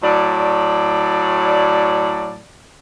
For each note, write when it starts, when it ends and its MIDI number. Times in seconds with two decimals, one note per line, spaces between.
0.02 2.42 45
0.02 2.42 54
0.02 2.42 74